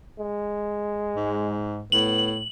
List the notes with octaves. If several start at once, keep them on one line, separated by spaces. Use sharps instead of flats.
G#3
G#2
A2 B3 F#7